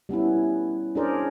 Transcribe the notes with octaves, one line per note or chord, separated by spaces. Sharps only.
G3 B3 C#4 E4
C#4 D4 G#4 A#4 C5 D5